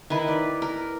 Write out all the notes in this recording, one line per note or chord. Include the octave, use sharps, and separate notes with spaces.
D#3 E4 B4
D5
A#4